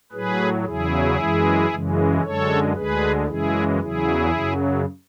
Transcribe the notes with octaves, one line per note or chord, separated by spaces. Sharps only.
A2 F#3 G#4 B4
E2 C#3 F#3 E4 G#4
F#2 E3 G#3
F#2 C#3 E3 G#3
F#2 D3 G#3 A4 C#5
D2 D3 G#3 G#4 B4
F#2 C#3 E3 G#3 E4 G#4
E2 C#3 F#3 E4 G#4
F#2 C#3 F#3